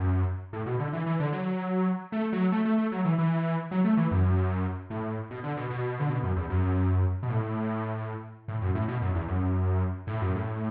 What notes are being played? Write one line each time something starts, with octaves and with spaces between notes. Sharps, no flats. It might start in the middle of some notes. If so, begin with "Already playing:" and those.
Already playing: F#2
A2
B2
D3
E3
E3
D3
F#3
A3
F#3
A3
A3
A3
F#3
E3
E3
F#3
A3
E3
F#2
A2
B2
D3
B2
B2
D3
B2
F#2
E2
F#2
B2
A2
A2
F#2
A2
B2
F#2
E2
F#2
A2
F#2
A2